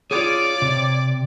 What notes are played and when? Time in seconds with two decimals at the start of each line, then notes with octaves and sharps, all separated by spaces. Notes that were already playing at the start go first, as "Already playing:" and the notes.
0.11 F4 G#4 C#5 D5 D6
0.62 C3